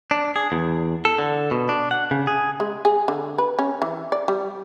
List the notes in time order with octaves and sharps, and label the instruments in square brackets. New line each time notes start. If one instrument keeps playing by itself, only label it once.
[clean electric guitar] D4
G#4
E2
A4
D3
B2
D4
F#5
C#3
G#4
[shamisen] G#3
G#4
D3
B4
C#4
E3
D5
G3